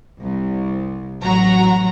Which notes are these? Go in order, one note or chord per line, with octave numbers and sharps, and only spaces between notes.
C2
A1 F#3 F#4 A#5